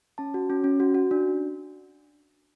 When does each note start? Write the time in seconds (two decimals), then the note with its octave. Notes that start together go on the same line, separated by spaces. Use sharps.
0.18 C#4 A5
0.34 F#4
0.50 C#4
0.64 C#4
0.80 F#4
0.95 F#4
1.11 D4